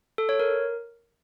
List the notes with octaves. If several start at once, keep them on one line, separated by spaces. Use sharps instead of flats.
A4
C#5
A#4